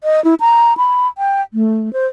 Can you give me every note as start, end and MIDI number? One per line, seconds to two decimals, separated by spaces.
0.04 0.23 75
0.24 0.35 64
0.40 0.77 82
0.77 1.07 83
1.18 1.42 79
1.54 1.92 57
1.93 2.06 72